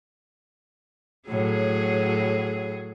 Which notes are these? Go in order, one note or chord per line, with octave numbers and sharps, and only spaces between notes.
A2 F#3 G#4